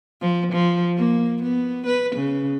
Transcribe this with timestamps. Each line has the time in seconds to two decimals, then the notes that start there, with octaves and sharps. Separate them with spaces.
0.21 F3
0.52 F3
0.97 A#3
1.42 B3
1.86 B4
2.16 C#3